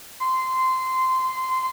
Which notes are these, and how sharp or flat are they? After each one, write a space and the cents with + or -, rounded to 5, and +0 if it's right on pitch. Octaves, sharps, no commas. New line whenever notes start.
C6 -15